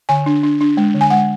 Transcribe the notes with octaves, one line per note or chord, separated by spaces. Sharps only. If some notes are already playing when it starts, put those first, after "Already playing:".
D3 G#5
D4
D4
D4
G#3
D3
G#5
G#3 F#5